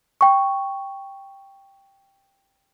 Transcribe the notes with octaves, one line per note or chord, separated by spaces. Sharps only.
G5 C#6